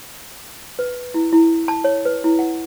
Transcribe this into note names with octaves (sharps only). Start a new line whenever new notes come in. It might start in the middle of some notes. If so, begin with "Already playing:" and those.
B4
E4
E4
A5
C#5
B4
E4
F#5